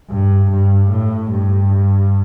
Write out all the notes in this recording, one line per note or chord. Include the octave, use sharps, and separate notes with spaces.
G2
G2
A2
G2